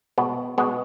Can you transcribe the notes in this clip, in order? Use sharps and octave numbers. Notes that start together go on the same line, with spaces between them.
B2 G#3 B3
B2 G#3 B3